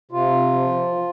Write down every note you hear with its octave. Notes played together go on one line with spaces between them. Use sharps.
C3 F4
F3
F3